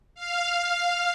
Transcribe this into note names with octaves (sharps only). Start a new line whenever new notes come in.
F5